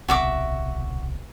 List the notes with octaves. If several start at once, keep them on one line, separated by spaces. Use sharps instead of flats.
D1 B1 C3 F#4 E5 D6